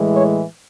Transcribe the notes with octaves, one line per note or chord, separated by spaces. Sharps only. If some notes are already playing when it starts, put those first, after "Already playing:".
Already playing: A2 E3 G#3
C#5